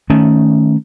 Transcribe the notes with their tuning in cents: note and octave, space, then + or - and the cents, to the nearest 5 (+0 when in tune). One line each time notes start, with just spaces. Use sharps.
D#3 +0 A3 +0 C#4 +0